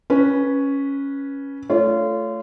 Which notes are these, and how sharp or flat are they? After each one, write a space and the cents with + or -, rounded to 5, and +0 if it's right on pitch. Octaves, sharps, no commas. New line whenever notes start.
C#4 +0 B4 -15
A3 +0 F4 -25 C#5 +25